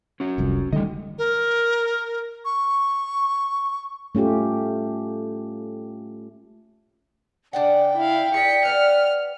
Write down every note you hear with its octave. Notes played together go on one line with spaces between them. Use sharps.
C#4 F#4
F1 C2 F2
D3 D#3 G3 A3 D#5
A#4
C#6
A3 C#4 F4 G4
C#3 D4 D5 F#5 G5
E4 F5
G#4 D5 B6 C#7
B4 D5 F#5 F6